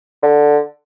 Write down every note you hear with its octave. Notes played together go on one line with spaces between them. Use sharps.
D3